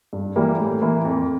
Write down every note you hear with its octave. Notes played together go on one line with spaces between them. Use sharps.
G2
E3 G3 A#3
A2
E3 A#3
F2